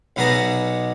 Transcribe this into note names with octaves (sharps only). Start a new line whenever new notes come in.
B1 B2 B3 G#4 D5 A#5